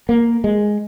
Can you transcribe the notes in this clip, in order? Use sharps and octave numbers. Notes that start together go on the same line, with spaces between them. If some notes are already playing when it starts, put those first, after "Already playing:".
A#3
G#3